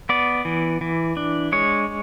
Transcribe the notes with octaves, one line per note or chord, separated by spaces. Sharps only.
B3 D5
E3
E3
D4
G#3 C#5